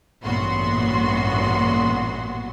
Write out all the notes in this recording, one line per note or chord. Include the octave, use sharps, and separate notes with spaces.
A1 G2 A#2 B3 F#4 C6